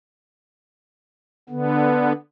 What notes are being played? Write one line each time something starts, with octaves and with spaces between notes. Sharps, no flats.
D3 B3